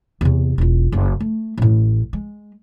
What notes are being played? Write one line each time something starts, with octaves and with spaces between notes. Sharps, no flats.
E2 C3
E1 F4
F#1
A3
A1 A2
G#3